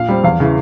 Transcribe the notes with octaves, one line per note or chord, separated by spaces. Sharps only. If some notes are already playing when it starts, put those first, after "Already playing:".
Already playing: A#2 F5
G3 C4
E2 F5
C#3 E3